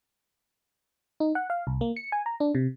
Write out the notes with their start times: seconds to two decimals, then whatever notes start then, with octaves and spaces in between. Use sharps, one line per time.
1.20 D#4
1.35 F#5
1.50 F5
1.67 C2
1.81 A#3
1.96 C#7
2.12 G#5
2.26 A#5
2.40 D4
2.55 C3